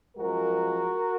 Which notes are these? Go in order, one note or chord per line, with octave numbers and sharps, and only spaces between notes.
F#2 F3 G#3 F#4 A#4